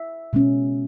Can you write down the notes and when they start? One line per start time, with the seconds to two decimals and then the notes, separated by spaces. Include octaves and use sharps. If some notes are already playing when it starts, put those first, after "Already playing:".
Already playing: E5
0.33 B2 G#3 C#4